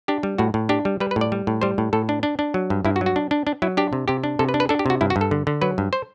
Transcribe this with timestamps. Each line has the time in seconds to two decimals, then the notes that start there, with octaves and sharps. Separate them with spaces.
0.08 D4 G4
0.23 G3
0.38 A2 F#4
0.54 A2
0.69 D4 G4
0.85 G3
1.00 G3 B4
1.11 B4
1.16 A2
1.21 D5
1.32 G3
1.47 A2
1.61 G3 C5
1.78 A2
1.93 A2 A4
2.09 D4
2.23 D4
2.39 D4
2.54 F#3
2.70 G2
2.85 G2 E4
2.96 F#4
3.01 F#3
3.06 F#4
3.16 D4
3.31 D4
3.47 D4
3.62 F#3 E4
3.77 D4 G4
3.93 C3
4.08 C3 G4
4.24 D4
4.39 C3 A4
4.49 B4
4.54 D4
4.60 B4
4.69 D4 A4
4.79 G4
4.86 C3 F#4
5.01 G2 E4
5.10 F#4
5.16 G2
5.21 A4
5.31 D3
5.47 D3
5.61 F#3 B4
5.78 G2
5.93 C5